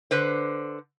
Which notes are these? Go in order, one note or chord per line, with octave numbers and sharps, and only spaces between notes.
D3 B4 C5